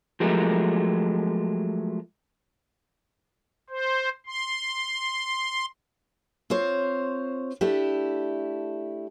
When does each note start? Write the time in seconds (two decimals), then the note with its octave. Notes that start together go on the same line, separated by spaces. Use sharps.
0.20 F3 F#3 G#3 A3 G4 A#4
3.69 C5
4.26 C6
6.50 C4 F4 C5 C#5
7.61 A3 D4 E4 G4